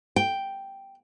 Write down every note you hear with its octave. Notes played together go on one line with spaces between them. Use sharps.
G5